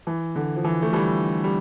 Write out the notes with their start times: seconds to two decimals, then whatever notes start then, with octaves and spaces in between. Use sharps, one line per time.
0.07 E3
0.36 D3
0.56 F3
0.64 E3
0.82 A3
0.93 E3 G3
1.44 G3